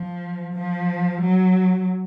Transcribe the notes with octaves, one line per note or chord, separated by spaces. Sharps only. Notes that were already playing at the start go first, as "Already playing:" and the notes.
Already playing: F3
F3
F#3